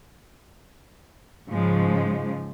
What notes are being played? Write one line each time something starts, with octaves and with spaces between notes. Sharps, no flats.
G#2 C#3 F3 G#3